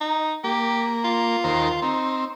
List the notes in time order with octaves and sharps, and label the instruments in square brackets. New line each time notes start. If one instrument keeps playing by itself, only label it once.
[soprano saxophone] D#4
[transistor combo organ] A#3 [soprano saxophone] G4
[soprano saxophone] F4
[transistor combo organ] D#2 A#4 C5
[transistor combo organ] C4 [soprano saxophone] D#4